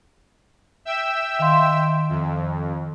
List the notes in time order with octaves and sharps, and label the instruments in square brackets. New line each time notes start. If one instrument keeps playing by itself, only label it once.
[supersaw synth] E5 G5 E6
[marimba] D#3 F5 C6
[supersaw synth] F2